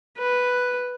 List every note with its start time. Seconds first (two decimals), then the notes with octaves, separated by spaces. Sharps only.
0.17 B4